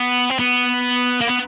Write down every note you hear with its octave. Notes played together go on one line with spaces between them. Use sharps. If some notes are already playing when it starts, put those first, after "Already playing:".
Already playing: B3
C4
B3
A#3
B3